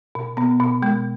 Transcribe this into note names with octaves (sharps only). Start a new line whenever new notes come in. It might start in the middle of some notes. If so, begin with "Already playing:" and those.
B2
B2 B3
B2
B2 G#3